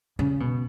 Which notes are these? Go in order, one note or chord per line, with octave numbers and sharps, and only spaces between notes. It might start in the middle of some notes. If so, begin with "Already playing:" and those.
C#3
B2